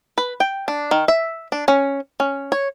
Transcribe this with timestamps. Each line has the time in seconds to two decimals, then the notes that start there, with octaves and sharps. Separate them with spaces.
0.18 B4
0.40 G5
0.68 D4
0.91 D#3
1.08 E5
1.52 D4
1.68 C#4
2.20 C#4
2.52 C#5